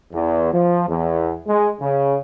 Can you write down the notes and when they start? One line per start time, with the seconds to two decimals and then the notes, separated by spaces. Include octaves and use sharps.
0.12 E2
0.52 F3
0.87 E2
1.47 G#3
1.80 C#3